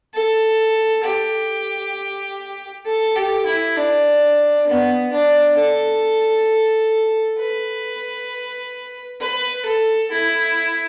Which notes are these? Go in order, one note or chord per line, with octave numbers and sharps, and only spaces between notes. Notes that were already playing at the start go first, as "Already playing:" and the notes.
A4
G4
A4
G4
E4
D4
B3
D4
A4
B4
B4
A4
E4